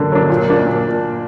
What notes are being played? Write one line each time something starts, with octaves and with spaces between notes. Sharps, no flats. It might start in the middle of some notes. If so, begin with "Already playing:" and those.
Already playing: D3 F#3 A#3 D4
F#3 A#3 D4
A#2
A#3 D4
A#2